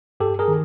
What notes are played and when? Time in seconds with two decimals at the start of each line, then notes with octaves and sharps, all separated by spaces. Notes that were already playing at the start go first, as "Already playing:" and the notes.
0.20 G2 G4 A4
0.39 G#4 A#4
0.48 D#3